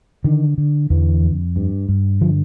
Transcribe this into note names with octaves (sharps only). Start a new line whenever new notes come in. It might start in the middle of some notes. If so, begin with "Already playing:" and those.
D3 D#3
D3
E2 D3 E3
F2
G2
G2
D3 F3